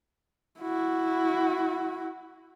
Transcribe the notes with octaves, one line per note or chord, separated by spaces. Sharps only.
E4 F#4